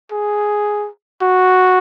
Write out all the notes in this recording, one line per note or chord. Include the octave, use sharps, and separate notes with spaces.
G#4
F#4